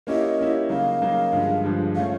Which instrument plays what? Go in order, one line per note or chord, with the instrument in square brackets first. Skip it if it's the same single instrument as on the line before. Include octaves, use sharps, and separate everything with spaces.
[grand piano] A#3 C#4 E4 G4 [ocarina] D#5
[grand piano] A#3 C#4 E4 G4
[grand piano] C#3 F#3 A#3 D#4 [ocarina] F5
[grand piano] C#3 F#3 A#3 D#4
G2 D3 F3 G#3
G2 D3 F3 G#3
[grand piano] F3 A3 C#4 [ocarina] F5